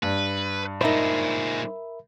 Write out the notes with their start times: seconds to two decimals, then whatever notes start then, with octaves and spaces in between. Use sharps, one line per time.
0.03 G2 B4
0.81 A#2 G#3 D#4 A#4 C5 E5 B5